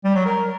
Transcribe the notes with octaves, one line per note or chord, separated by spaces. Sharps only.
G3
F#3
A#4